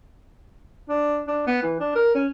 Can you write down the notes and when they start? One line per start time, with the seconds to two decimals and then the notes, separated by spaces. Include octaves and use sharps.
0.89 D4
1.27 D4
1.47 B3
1.62 E3
1.80 D4
1.95 A#4
2.15 C#4